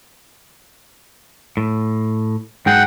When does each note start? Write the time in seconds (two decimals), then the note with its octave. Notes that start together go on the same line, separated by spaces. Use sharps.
1.57 A2
2.66 G#2 F#3 G#4 F#5 G5